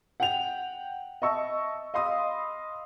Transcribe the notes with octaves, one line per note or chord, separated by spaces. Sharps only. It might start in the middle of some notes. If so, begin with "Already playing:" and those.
F#5 G5 F7
D#5 E5 A5 C#6 E6
D#5 F5 B5 C6 D#6